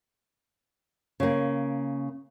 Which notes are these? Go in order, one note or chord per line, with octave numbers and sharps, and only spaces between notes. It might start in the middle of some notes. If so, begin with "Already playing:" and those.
C#3 A#3